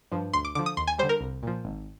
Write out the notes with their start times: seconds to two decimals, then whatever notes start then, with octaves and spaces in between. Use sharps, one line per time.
0.12 G2 F3
0.33 D2 C6
0.45 D6
0.55 D3 F3 D6
0.66 D#6
0.77 D#2 C6
0.87 G#5
0.98 G3 C5
1.03 D3
1.09 A#4
1.20 C2
1.43 A#2 F3
1.65 G#1